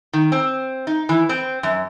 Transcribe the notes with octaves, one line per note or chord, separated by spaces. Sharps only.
D#3
C4
D#4
E3
C4
F#2